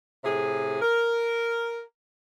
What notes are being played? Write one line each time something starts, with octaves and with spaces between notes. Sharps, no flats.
A2 C3 G#4
A#4